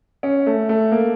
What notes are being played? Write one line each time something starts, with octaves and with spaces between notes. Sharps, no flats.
C#4
A3
A3
A#3